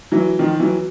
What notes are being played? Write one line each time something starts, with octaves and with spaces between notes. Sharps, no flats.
E3 F#3
D#3 F3
E3 F#3